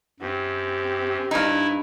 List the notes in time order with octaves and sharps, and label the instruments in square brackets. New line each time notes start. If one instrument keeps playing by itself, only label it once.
[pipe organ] F#2 [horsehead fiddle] C4 G4
[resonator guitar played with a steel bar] G2 D#4 [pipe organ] E4